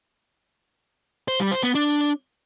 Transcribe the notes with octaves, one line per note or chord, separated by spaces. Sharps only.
C5
G3
C5
B3
D4